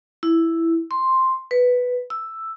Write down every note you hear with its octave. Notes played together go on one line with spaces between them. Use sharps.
E4
C6
B4
E6